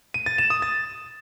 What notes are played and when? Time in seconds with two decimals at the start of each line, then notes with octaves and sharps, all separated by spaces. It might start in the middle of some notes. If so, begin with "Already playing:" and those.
0.14 D#7
0.26 A6
0.38 E7
0.50 D#6
0.62 A6